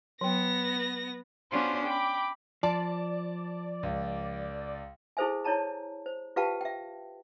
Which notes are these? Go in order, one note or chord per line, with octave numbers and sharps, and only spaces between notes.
F#3 B3 G5 A#6
B3 C#4 D4 F4 F#4 C5
G5 B5 D6
F3 D5 A5
C#2
E4 G#4 A4 C5 E5 G#5
E4 C#5 D5 A5 A#5
C5
F4 G4 B4 F5 G5 A5
E5 G5